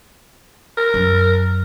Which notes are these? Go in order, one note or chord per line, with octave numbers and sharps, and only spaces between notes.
A#4
F#2